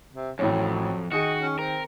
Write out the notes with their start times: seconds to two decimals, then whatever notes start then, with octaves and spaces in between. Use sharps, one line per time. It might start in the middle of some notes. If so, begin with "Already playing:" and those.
0.14 C3
0.39 A1 F2 A2 F#3 C#5
1.12 D#3 F#4 G#4 D#5 C#7
1.40 C#4
1.59 C4 A#4